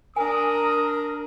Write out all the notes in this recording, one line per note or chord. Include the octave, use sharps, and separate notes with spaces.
D4 A#4 G#5 D#6